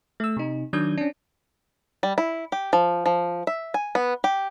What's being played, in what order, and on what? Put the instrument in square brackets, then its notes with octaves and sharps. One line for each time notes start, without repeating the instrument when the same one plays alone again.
[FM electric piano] A3 E6
C3 D#4
D#3 F#3 D4 D#6 G6 G#6
C#4 D4
[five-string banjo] G3
E4
G4
F3
F3
E5
G#5
B3
G4